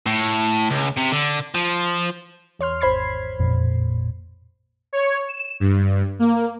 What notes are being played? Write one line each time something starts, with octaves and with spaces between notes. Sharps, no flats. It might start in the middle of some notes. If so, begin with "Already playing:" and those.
A2
C#2
C3
D3
F3
E2 C#5 C6 F6
G#1 C5 B5 G#6 C7
A1 F2 A#2
C#5
E7
G2
A#3